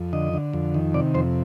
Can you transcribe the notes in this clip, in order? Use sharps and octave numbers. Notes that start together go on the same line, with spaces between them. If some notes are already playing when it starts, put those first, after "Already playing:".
Already playing: F2
D3 D#5
D3
F2
D#3
C3 D5
F2 C5